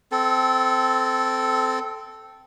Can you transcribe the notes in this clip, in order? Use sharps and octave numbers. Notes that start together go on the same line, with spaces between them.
C4 A4